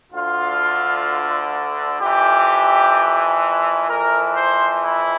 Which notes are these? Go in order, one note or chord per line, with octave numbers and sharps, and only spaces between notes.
D2 D3 F4
F2 E3 G4
F2 E3 A#4
C5
E4